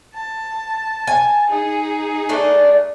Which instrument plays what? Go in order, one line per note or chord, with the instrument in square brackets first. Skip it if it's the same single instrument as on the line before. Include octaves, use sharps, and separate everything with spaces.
[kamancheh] A5
[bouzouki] G#5
[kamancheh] D#4 G#4
[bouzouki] A3 D4